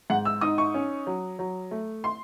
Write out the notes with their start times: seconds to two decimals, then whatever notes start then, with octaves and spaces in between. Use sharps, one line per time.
0.10 G#2 F#5
0.25 E6
0.41 D#4 D#6
0.58 C#6
0.74 C#4
1.07 F#3
1.39 F#3
1.71 A3
2.04 C6